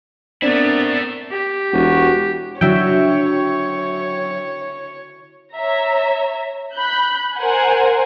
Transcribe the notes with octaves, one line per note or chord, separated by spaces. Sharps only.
A3 B3 C4 D4 E4 A#4 D5
G4
E1 F#4
D3 F#3 E4 F#4 C#5 E5 G5
C#5 E5 A#5
B5 F#6 G6
A#4 C5 F#5 G#5